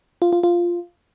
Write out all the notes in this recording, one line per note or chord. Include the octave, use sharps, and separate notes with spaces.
F4
F4
F4